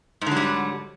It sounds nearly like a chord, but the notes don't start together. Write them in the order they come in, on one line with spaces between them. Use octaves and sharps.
G#2 D3 F#3 G3